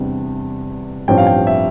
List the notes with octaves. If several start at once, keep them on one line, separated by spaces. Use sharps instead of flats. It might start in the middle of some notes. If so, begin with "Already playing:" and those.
Already playing: E2 C3 G3 D4
A1 G2 F3 C4 G5
F5
G5
E5